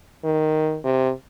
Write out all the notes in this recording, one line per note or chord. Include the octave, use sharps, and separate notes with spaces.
D#3
C3